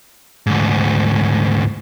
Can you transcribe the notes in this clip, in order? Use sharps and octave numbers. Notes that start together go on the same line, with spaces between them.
D2 G#2